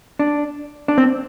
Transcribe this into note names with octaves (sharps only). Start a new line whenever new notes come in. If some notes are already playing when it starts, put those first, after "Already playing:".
D4
D4
C4